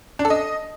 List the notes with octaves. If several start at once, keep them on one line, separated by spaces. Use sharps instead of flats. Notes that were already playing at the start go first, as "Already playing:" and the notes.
D4
A4
D#5